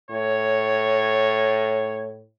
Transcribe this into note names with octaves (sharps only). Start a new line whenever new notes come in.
A2 C#5